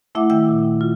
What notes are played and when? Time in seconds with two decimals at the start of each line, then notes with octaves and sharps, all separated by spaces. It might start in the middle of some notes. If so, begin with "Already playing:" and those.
0.15 A3 E4 E5 F#5 D6
0.30 D#3 E5 G5 E6
0.49 A#2
0.81 F4